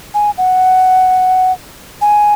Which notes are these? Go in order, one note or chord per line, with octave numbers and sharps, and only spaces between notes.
G#5
F#5
G#5